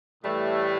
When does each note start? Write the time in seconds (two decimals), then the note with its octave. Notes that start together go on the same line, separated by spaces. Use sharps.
0.24 A2 E3 G3 A3